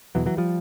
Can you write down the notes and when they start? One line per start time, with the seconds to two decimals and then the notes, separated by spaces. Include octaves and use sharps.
0.15 E2 B2 E3 F#3
0.26 E3 F#3
0.37 F3 G3